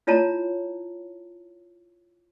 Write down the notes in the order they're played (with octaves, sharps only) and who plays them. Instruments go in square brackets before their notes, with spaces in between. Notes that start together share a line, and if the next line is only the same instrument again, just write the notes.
[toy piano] E4 F4 C#5 A5 A#5